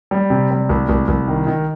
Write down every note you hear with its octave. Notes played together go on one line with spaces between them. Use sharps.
G3
C3
G3
C2
C2
C2
D#3
D#3